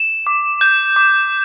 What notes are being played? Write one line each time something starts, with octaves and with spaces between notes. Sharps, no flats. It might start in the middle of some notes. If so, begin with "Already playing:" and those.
Already playing: E7
D6
G6
D6